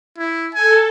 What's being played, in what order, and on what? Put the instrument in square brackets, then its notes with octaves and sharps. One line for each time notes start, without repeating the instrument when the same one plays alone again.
[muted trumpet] E4
[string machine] A4 [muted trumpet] G#5